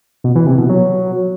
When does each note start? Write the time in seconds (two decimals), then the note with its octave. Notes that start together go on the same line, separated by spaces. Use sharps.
0.24 B2
0.36 E3
0.47 C3
0.58 B2
0.69 F#3